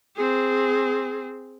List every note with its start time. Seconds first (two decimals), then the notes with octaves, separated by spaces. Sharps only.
0.16 C4 G#4